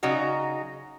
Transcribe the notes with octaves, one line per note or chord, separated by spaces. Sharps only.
C#3 F#3 D#4 F#4